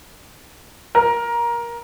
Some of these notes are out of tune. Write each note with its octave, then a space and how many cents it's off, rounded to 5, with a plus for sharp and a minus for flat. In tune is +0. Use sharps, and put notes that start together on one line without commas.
A#4 +20